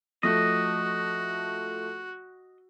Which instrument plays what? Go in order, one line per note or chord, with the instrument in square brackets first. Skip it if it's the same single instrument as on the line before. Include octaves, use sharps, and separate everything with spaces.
[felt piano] F3 A3 [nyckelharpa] F#4 [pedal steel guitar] D#5